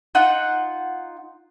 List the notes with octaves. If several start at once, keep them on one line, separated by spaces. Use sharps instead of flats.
D#4 F4 F#5